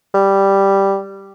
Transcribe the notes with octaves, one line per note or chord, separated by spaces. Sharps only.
G3